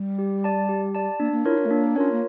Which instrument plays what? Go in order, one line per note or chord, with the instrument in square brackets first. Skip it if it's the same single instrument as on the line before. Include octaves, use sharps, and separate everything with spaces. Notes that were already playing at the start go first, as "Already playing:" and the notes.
Already playing: [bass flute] G3
[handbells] G4
D5 A5
G4
D5 A5
[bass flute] A#3 [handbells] D4
[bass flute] A#3
[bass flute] E4 [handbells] F4 A#4 C#5
[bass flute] D4
A3
[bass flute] A#3 [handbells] D4
[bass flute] C#4 [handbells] F4 A#4 C#5
[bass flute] A#3